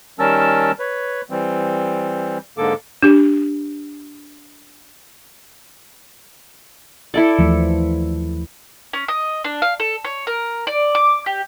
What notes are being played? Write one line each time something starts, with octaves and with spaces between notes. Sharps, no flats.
D#3 G3 C#4 A#4 A5 E6
B4 C#5
E3 G3 C4
G#2 D3 A#3 A4 D6
D4 G4
E4 A4 D5
D#2 E3 F3 A3
C#4
D#5
D4
F5
A4
C#5
A#4
D5
D6
G4